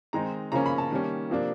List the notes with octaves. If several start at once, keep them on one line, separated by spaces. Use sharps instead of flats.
D#3 G#3 C4 D#4 A#5
C#3 F3 A#3 C#4 A#5
B5
A5
D#3 G3 A#3 C#4
C3 F3 A#3 D4